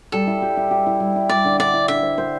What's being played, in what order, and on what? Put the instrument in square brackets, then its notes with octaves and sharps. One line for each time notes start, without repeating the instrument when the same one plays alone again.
[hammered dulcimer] G3 [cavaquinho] A4
[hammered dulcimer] E4
G4
E4
G4
E4
G3
E4
[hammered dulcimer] G3 [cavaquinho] D5
[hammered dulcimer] D3
[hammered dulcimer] D3 [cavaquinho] D5
[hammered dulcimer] E4
[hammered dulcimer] D3 [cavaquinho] E5
[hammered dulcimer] C5
C5